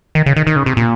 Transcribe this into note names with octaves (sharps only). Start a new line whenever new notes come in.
D#3
C#3
D#3
D#3
C#3
C3
A#2